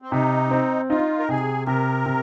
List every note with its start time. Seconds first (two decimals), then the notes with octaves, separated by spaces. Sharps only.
0.02 C4
0.11 C3 D#4
0.51 C4
0.90 D#4 F4
1.19 A#4
1.29 C3 G#4
1.67 C3 A#4
2.06 C3